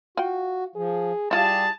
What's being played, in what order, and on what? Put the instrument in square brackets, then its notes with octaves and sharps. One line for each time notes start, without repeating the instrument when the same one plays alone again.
[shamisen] F4 G5 [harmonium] F#4
[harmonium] F3 [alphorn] G#4
[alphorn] G3 [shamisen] E4 F4 F5 [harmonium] G4 [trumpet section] G#4 A5